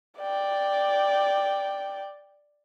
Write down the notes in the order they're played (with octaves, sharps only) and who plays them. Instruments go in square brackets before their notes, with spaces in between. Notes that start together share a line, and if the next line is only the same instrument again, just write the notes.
[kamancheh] D5 G5